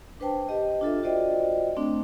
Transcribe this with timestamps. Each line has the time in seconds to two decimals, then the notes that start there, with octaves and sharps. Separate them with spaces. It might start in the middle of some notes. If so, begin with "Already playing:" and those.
0.20 D4 B4 C5 G5 A5
0.49 G4 D#5
0.81 D4 F4 A4 E5
1.03 F4 F#4 C5 D5 D#5 G5
1.77 A3 C4 D4